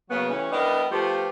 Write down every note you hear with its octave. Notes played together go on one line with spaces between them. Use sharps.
C#3 F#3 A#3 B3
E3 G3 A3 C#4
G3 B3 D4 E4 A#4 D#5
F3 A3 B3 F4 G4